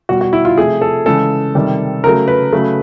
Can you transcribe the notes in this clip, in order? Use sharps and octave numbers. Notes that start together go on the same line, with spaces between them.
B2 G3 F#4
F#4
E4
F4
C3 F3 A3 G#4
A4
C#3 E3 G#3 A4
C3 D#3 G3
C#3 F#3 A3 A#4
B4
C#3 F#3 A3